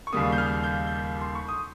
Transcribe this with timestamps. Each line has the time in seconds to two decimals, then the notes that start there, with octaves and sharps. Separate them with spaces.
0.07 C#6
0.13 D#2 C#3 G3 A#3 D#6
0.32 G6
0.38 F6
0.63 G6
0.87 G6
1.21 C6
1.35 C#6
1.49 D#6